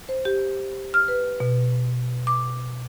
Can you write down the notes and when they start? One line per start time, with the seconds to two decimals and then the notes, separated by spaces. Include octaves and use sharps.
0.09 C5
0.25 G4
0.94 F6
1.08 B4
1.40 B2
2.27 D6